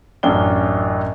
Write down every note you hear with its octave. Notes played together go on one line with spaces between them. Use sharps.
A1 F#2 C#4 D4 F5 G7